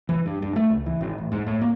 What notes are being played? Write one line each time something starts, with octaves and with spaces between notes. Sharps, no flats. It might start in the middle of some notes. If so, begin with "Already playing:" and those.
E3
G2
G2
A3
C#2
E3
G#1
A1
G#2
A2
A#3